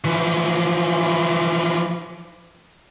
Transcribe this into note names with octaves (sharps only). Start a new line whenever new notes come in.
E3 F3